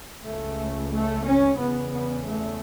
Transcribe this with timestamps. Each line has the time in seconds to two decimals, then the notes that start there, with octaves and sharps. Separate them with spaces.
0.25 C#2 C#3 A3
0.91 A3
1.24 C#4
1.57 E2 C#3 B3
1.90 B3
2.23 A3